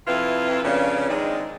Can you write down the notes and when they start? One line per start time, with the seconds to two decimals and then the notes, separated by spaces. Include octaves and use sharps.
0.07 F2 C3 E4 F4 B4
0.63 F2 C#3 A#3 B3 D4 C#5
1.09 D#3 G#3 C4 D4 D#4